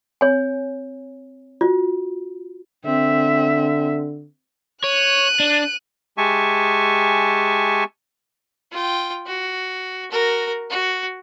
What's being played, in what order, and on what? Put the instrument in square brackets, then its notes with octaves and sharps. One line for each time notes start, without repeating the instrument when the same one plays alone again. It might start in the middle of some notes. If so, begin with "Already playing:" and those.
[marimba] C4 [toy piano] C#5 G#5
[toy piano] F4 [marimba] F#4
[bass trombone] D3 [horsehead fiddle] C4 E5
[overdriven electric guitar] C#5 [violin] F#6 D#7
[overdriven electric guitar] D4
[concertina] G#3 G4 E5 G#5 A5 C#6
[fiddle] F4 G5
F#4
F#4 A#4
F#4